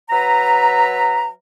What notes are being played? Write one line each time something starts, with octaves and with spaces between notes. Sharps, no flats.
F#3 B4 E5 A#5